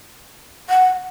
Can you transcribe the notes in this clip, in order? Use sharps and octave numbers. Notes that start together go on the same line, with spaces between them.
F#5